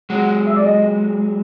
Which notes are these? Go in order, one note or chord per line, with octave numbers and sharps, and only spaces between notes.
F#3 G#3 F#5
E5
D5
D#5